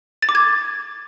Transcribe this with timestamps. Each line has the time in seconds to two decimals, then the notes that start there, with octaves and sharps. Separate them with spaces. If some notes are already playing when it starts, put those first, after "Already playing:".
0.22 A6
0.29 D6
0.35 G#6